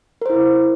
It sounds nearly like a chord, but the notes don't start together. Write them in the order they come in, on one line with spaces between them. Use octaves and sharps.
A#4 C5 E4